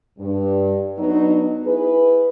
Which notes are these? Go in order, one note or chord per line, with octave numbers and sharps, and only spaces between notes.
G2
F#3 B3 D4 D#4
E4 G#4 B4